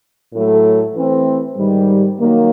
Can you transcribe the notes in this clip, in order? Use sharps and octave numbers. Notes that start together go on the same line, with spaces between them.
A2 F#3 A3
E3 A3 C4
G#2 D#3 G3
D#3 F#3 A#3